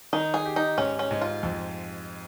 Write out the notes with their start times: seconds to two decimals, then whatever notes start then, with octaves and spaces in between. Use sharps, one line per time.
0.13 D#3 D#4
0.34 G#4
0.45 G4
0.56 D#4
0.78 G#2 C#4
0.99 C#4
1.11 G#2
1.21 F4
1.43 F2